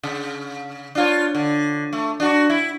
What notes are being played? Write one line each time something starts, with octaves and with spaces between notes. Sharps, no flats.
C#3
D4 F4 C#5
D3
A3
D4 F#4
E4